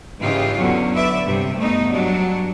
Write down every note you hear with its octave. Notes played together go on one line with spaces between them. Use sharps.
G#2 C#3 E3 D#4 F4 G4
E2 D3 F#3 C#4
B4 D5 E5
G2 C3
A3 B3 D#4
G2 F#3 D4